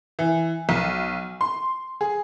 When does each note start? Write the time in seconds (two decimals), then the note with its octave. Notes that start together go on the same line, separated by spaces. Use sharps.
0.19 E3
0.69 B1
1.41 C6
2.01 G#4